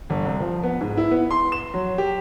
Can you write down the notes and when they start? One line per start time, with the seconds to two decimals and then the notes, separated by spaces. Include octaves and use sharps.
0.10 G1
0.25 C2
0.40 F3
0.63 B3
0.81 G#2
0.97 E4
1.11 B3
1.31 C6
1.52 E7
1.74 F#3
1.98 G4